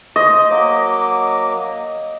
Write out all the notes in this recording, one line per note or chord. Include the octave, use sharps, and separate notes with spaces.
C5 D#5
F#3 A#3 D6